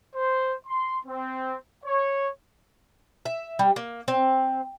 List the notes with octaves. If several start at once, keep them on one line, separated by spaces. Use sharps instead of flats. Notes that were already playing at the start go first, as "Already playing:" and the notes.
C5
C6
C4
C#5
E5
G3
A#3
C4